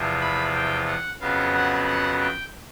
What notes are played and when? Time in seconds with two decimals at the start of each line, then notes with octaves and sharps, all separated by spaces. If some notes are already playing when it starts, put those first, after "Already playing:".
Already playing: E2 C3 F3
0.21 B5
0.53 G5
0.87 F#5
1.20 F2 C#3 F#3 B3 F5
1.53 F#5
1.86 F#5
2.20 G5